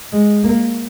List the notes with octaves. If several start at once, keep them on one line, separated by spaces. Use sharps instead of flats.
G#3
A#3